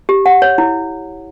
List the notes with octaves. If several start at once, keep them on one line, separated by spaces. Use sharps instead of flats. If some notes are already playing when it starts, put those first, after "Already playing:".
G4
F#5
C#5
E4